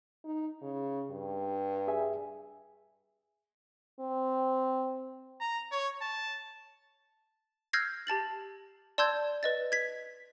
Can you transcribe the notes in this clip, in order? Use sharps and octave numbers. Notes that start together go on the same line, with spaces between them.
D#4
C#3
G2
G#4 E5 G#5
C4
A#5
C#5
A5
E6 F6 G6 G#6 A#6 C7
G4 A5 A6 F#7
D5 A5 C6 E6 G6 G#6
B4 D#5 A6
G#6 B6